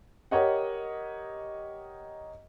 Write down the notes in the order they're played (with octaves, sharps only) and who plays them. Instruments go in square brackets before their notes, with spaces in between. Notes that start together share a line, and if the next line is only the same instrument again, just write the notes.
[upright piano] G4 A#4 C#5 D#5 F#5